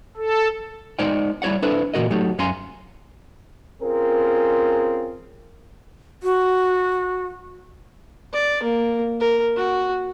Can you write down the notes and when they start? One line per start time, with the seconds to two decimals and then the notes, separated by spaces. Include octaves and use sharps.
0.17 A4
0.99 G#3 D#4 C5 D5 F#5 G5
1.42 G3 E4 C#5 D5 F#5
1.62 D4 E4 A4 B4 C5
1.94 A#2 E3 F3 F#4 A#4 D#5
2.10 F#3 A3 D#4 G4
2.39 F#2 C#4 F5 G#5 A#5 C6
3.82 C4 C#4 F4 G#4 A#4
6.23 F#4
8.33 D5
8.63 A#3
9.21 A#4
9.57 F#4